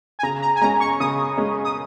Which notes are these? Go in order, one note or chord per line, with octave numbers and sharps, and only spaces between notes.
G#5
C#3 A#5
A#5
G#5
G#3 C#4 A#5
C#6
C#3 D#6
G#3 C#4
D#6